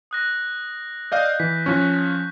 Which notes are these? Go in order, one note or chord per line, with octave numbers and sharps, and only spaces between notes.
D#6 F#6 A#6
D5 D#5 F5 G6
E3 B6
F3 C#4 C#6 F#6